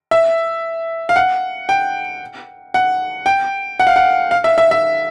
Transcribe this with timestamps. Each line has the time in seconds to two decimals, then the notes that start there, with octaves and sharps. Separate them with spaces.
0.11 E5
1.09 F5
1.16 F#5
1.69 G5
2.74 F#5
3.26 G5
3.80 F#5
3.87 F5
3.96 F#5
4.31 F5
4.44 E5
4.58 E5
4.71 E5